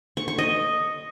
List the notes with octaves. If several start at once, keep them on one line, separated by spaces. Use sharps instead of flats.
C#6
C#6
D#5